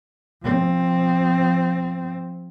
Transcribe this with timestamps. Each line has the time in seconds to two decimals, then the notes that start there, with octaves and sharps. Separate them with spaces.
0.43 F3 C4